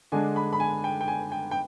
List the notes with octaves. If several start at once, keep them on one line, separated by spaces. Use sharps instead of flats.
D3 G#3 D4 G#5
B5
B5
G#5
G5
G5
G#5
G5
G5